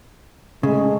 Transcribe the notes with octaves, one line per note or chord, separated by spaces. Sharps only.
C#3 G#3 A3